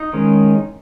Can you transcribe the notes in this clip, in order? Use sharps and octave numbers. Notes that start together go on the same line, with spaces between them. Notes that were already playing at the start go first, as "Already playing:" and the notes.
Already playing: D#4 D#5
D#3 G#3 C#4